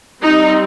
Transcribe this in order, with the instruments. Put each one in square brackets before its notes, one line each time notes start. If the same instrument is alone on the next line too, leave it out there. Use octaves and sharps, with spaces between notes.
[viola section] G3 C4 D#4